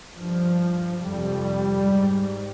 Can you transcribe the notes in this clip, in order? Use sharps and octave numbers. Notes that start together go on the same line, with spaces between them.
G2 F3
F2 C3 G3
G#2